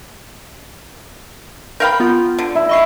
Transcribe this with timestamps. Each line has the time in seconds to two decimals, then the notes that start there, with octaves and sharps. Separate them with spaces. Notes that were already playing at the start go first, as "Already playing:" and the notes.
1.80 A#4 F5 G5 B5 G6
2.00 B3 F4
2.39 D3
2.55 E4
2.69 D#5 C#6 C7